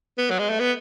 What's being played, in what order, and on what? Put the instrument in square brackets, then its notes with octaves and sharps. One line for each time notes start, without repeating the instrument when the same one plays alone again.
[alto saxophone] B3
F#3
G#3
A3
B3